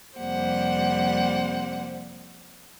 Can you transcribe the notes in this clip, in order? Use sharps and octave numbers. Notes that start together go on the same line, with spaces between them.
F2 C3 G3 A#3 C5 F#5